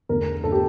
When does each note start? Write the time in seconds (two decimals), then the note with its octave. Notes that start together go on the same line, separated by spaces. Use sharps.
0.09 E2 D3 A3 A#4
0.44 D3 A3 A4
0.52 G4